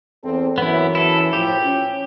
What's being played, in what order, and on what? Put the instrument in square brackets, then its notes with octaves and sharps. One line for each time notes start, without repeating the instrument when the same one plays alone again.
[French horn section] E2 C4 A4
[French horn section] F#2 E3 [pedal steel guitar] B3 E4
[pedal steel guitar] E4 A4
[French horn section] A2 F3 [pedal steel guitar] G4
[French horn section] C#4